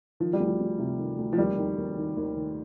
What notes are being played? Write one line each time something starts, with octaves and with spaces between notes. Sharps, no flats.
D#3 F3
G3
D2
F3
D2
C3
D#3
D2
F3
D#2 G3
D#3
D#2
D#3
D#2
D#3